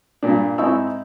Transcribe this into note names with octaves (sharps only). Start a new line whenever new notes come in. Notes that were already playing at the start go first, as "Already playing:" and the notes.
G2 A#2 D4
G#2 C4 D#4 E4 C#6 E6